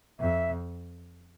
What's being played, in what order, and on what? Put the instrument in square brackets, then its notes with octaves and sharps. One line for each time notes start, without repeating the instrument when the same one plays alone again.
[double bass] F2 [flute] E5